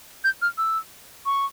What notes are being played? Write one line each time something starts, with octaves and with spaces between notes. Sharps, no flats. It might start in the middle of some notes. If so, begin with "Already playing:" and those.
G6
F6
E6
C#6